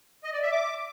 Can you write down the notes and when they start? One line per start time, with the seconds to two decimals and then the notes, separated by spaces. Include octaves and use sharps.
0.24 D#5
0.33 D5
0.42 E5
0.52 D6